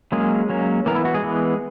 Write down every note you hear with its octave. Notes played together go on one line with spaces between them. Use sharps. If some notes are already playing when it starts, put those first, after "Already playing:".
F#3 G#3 A#3 C#4 G#4
F#3 A#3 C#4
E3 A#3 B3 A#4
E4
F#4
G#3 G#4
E3 B3